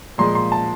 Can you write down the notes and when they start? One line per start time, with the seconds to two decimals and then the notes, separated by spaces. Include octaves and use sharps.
0.18 A#2 F3 G#3 C6
0.35 C6
0.52 A5